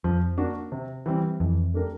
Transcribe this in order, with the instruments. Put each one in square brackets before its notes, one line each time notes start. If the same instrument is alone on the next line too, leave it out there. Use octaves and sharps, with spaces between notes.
[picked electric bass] F2 [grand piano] F3
[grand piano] A#3 D4 F#4
C3
E3 G3 C4
[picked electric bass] F2 [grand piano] E3
[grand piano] A3 D4 G4 A#4